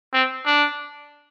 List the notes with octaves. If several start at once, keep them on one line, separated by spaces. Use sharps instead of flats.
C4
D4